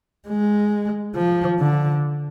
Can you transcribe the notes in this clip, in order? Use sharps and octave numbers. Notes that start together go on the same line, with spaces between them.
G#3
F3
D3